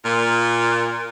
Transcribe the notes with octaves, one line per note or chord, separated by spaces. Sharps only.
A#2